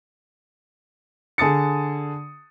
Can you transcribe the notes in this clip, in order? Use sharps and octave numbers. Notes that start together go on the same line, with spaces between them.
D3 G#4 A5 D#6 A6 C#7